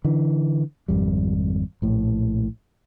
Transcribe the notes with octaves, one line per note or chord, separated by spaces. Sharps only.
D3 E3
G#1 F2 G3
A#1 A2